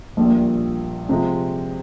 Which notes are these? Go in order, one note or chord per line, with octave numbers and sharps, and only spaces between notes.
A#1 A#2 G3
C3 F3 G#3